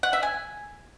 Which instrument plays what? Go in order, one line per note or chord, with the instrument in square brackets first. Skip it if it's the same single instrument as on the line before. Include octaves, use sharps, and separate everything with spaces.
[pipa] F#5
E5
G#5